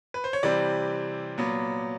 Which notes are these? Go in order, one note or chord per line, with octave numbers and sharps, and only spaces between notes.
B4
C5
C#5
C3 E3 G3 C4 D5
A#2 F#3 B3